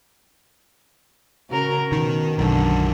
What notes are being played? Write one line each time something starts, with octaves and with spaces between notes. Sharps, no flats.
C#3 F#4 A#4
B2 D#3
B1 F#2 D3 D#3